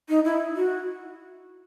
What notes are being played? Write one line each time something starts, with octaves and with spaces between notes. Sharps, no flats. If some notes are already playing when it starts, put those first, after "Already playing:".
D#4
E4
F#4